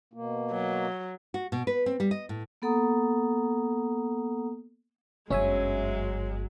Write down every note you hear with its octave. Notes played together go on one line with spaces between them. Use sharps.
B2 A#3
F#3
F#4
B2
B4
C4
G3
D#5
A2
A#3 B3 A4 F#5 A#5 D#6
G1 F#2 F#3 G#3 C#4 C#5 E5 G#5